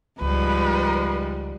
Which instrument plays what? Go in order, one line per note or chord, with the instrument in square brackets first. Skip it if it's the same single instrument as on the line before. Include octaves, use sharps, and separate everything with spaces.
[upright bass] C#2 [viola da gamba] G#2 F3 G3 [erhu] B4